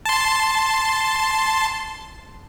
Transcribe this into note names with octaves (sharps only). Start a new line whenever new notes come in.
A5 C6